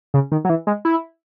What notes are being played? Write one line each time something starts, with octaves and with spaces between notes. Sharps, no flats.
C#3
D#3
F#3
E3
G#3
E4